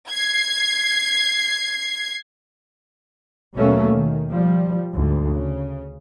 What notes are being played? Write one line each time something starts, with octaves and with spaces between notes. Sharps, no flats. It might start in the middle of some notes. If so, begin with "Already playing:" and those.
G#6 C7
D#2 B2 F#3 A3 A#3 C#4
D#3
F3 G3
D2 G#2
C#3